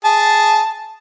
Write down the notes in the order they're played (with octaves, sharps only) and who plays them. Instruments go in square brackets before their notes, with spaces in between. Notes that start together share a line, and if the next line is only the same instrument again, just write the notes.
[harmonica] G#4 A5